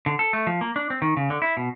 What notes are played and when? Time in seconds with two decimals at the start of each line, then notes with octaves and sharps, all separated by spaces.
0.06 D3
0.19 A4
0.33 A3
0.47 F3
0.61 A#3
0.76 D4
0.90 C4
1.02 D#3
1.17 C#3
1.30 D3
1.42 E4
1.57 B2